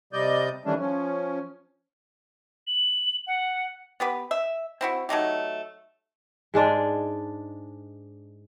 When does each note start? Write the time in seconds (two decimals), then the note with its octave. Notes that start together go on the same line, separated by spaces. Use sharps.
0.13 C3 G3 D5 D#5 G6
0.65 D#3 E3 G3 A3 C#4 D4
0.79 F3 C#4
2.67 F#7
3.27 F#5
4.00 B3 G4 B4
4.31 E5
4.81 C4 E4 F#4
5.09 F#3 A3 D#4 G4
6.54 G#2 G#3 D4 D5